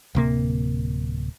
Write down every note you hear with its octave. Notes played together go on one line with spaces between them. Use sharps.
D1 C3 A#3